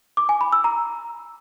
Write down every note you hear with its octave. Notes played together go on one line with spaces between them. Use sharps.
D6
G#5
B5
E6
A#5